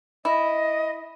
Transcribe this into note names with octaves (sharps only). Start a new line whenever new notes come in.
E4 D#5